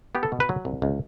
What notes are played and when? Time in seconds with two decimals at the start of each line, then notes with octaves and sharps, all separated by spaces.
0.15 B3 G4
0.23 A4
0.32 B2
0.40 B4
0.49 F#3
0.65 C2
0.82 C#2